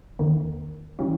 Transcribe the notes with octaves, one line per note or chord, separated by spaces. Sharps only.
E2 D#3 A#3
E3 G3 C#4